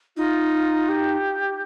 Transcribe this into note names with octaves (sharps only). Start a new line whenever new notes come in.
D#4 F4
G4